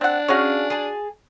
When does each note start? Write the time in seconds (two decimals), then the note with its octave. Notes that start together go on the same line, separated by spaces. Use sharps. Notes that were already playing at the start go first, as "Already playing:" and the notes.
0.01 C4 D4 F#5
0.28 C#4 F#4 G#4 C#5 F5
0.70 G#4 G#5 A5